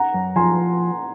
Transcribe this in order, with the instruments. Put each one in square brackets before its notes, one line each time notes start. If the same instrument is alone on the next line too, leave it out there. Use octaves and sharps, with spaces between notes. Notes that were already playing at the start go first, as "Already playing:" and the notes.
Already playing: [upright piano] F#5 A#5
[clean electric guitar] F#2
[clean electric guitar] F3 [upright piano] G#5 C6